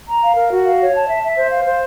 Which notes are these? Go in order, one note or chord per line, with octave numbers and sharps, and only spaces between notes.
A#5
F5
A#4
F#4
F5
C#5
A5
E5
E5
C5
F5
C5